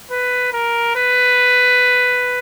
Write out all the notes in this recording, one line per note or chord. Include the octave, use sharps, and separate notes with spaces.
B4
A#4
B4